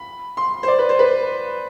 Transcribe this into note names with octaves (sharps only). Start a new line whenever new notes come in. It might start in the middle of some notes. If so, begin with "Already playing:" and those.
Already playing: B5
C6
C5
D5
B4
C5
B4